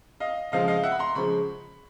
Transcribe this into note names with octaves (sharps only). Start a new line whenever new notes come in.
D#5 F5
C#3 F3 G#3 D#5 F5
D#5 F5
E5 F#5
B5
A#5 C6
C#3 F3 G#3 B5 C#6